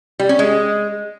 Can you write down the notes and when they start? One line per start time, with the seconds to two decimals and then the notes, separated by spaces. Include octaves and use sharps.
0.20 G3
0.29 C#4
0.39 G#3